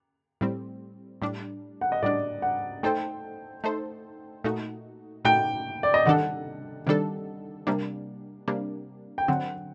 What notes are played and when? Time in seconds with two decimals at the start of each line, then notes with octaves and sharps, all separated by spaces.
0.41 A2 G3 C4
1.22 A2 G3 D4
1.81 F#5
1.92 D#5
2.03 A2 G3 D4 D5
2.42 F#5
2.83 A3 D#4 A4 C5 G5
3.64 A3 D#4 A4 C5
4.44 A#2 A3 D#4 F#4
5.25 A#2 A3 D#4 F#4 G5
5.83 D5
5.94 D#5
6.06 C3 D#3 G3 D4 A4 F#5
6.87 C3 D#3 G3 D4 A4
7.67 C3 G3 A#3 D4
8.48 C3 G3 A#3 D4
9.18 G5
9.28 D3 F#3 C4 F#5